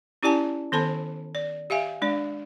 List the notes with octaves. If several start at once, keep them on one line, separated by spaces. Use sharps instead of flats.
C#4 E4 G4 D5 G#5 A5
D#3 B3 A4 C5 A5 B5
D5
G4 E5 F5 G#5
G#3 D4 D5